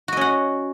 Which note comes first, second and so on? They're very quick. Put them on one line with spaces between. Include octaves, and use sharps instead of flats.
F#4 D#5 C#4 F#5